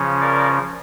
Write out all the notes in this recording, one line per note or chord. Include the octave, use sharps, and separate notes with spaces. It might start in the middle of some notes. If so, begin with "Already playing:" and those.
Already playing: C#3 F3 C#4
A#4 D5